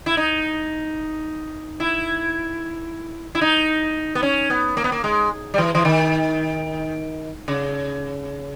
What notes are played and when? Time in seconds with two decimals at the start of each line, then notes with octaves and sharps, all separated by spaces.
0.06 E4
0.17 D#4
1.80 E4
3.35 E4
3.41 D#4
4.15 B3
4.23 C#4
4.50 B3
4.77 A#3
4.84 B3
4.92 A#3
5.04 G#3
5.54 G3
5.58 E3
5.75 E3
5.85 D#3
7.48 C#3